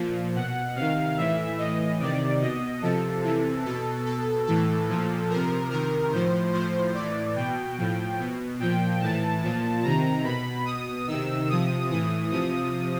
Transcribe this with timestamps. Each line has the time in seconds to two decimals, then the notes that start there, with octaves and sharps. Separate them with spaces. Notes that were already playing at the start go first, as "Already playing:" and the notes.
Already playing: A#2 F3
0.35 B2 F#5
0.76 C3 D#3 F5
1.17 A2 E3 E5
1.58 A2 E3 D#5
1.99 C3 D#3 D5
2.41 B2 D#5
2.82 C3 F3 A4
3.23 C3 E3
3.65 B2 A4
4.06 B2 A4
4.47 A2 E3 A4
4.89 A#2 F3
5.29 C3 F3 A#4
5.71 C3 D#3 A#4
6.12 A2 F3 C5
6.53 A2 F3 C5
6.94 A2 E3 D5
7.36 B2 G5
7.78 A2 F3
8.19 B2
8.59 A#2 F3 G5
9.01 A2 E3 A5
9.43 A#2 F3
9.84 C3 D#3 A#5
10.24 B2 B5
10.65 B2 D#6
11.07 C3 D#3 E6
11.48 C3 F3 D#6
11.89 A2 E3 D#6
12.31 C3 F3 D#6